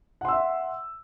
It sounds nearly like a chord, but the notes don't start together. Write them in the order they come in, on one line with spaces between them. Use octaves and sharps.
F#5 C6 E6 E5